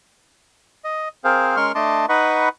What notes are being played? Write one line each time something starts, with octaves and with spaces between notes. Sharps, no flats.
D#5
C4 G#4 A#4 C5 F5
G#3 C#4 A#4 C6 C#6 F6
A3 D4 D#5 A5 C6 D6
D#4 B4 D#5 F#5 B5 C#6